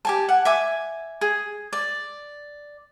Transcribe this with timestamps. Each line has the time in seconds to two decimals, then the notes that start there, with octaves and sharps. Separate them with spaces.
0.05 G4 G#5 A5
0.29 F#5
0.45 E5 G#5 D6
1.21 G#4
1.73 D5